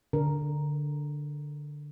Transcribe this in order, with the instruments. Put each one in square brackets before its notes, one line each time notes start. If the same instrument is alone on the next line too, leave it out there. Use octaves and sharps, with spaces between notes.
[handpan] D3 A#4